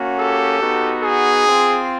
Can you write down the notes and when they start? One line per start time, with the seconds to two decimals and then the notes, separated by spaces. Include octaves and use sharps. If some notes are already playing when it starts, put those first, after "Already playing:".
Already playing: A#3 C#4 F#4
0.18 G4 A4
0.60 B3 D#4 F#4
1.03 G#4
1.46 C4 F4